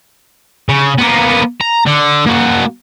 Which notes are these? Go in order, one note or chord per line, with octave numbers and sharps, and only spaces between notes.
C#3
A#3 B3
A#5
D3
A#3 F#4